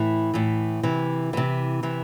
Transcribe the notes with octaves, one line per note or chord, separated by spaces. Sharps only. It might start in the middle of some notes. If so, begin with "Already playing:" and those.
Already playing: A2 E3 E4
A2 E3
C3 E3
C3 E3
C3 E3